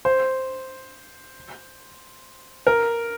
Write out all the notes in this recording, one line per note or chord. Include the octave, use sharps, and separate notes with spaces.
C5
A#4